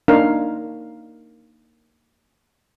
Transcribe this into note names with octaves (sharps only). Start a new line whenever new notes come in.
A#3 D4 D#4 A#4 C#5 F5